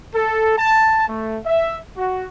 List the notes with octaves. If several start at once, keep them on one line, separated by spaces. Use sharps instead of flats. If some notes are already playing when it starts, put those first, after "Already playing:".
A4
A5
A3
E5
F#4